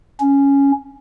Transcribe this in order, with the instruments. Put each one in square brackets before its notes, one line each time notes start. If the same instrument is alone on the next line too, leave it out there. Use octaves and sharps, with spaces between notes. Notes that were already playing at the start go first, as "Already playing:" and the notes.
[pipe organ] C#4